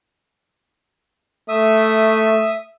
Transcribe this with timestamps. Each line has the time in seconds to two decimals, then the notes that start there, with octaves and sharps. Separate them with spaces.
1.48 A3 E5 D#6